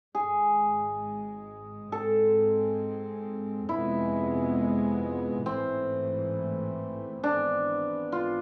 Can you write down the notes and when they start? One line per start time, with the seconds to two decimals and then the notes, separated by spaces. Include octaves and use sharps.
0.15 G#1 G#2 G#3 G#4
1.92 G#2 G#3 C4 A4
3.69 F2 C3 G#3 B3 E4
5.46 A1 G#2 E3 A3 C4
7.24 G#1 G#2 E3 B3 D4
8.12 F4